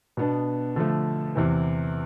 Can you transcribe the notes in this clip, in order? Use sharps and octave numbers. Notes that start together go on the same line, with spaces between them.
B2 B3 D4
D3 F3 A3
E2 C3 E3